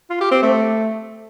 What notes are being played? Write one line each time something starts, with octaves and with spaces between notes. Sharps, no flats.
F4
G4
C4
A3